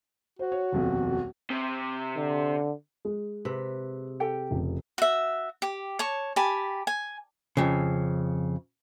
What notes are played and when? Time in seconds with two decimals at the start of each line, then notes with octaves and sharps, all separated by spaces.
0.39 F#4 C5
0.52 C#5
0.72 D#1 B1 F2
1.50 C3
2.17 D3
3.05 G#3
3.45 C3 B4
4.20 G4 A4 G5
4.51 F1 C#3
4.98 F#4 E5
5.62 G4
5.99 C#5 A5 C#6
6.36 G4 G#5 A5 B5
6.87 G#5
7.57 F2 C#3